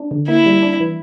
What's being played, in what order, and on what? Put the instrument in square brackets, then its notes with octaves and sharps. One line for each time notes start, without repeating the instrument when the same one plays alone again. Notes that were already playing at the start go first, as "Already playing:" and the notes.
Already playing: [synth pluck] D4
D3
[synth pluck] A#3 [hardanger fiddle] E4
[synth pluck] G3
D4
E3